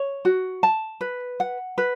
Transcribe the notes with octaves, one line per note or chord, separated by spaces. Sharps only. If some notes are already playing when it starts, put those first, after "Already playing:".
Already playing: C#5
F#4
A5
B4
F#5
B4